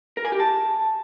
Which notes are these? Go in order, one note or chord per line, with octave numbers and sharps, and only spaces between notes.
A#4
G#5
G4
A5